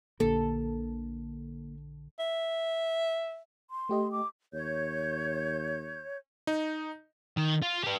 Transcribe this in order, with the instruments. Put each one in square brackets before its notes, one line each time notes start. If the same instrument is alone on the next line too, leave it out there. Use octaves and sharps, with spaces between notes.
[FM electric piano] A#1 D3 [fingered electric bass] A#3 [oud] A4
[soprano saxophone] E5
[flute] C6
[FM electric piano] A3 G4 D#5
[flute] D6
[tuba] D#2 [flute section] C#5 G6
[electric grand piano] D#4
[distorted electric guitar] D#3
F4
G4 B4